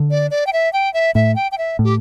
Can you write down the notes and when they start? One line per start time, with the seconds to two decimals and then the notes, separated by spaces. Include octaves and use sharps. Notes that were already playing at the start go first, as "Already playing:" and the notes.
Already playing: D3
0.11 D5
0.31 D5
0.47 G5
0.53 E5
0.73 G5
0.94 E5
1.15 A2 E5
1.36 G5
1.52 G5
1.58 E5
1.79 A2
1.84 G4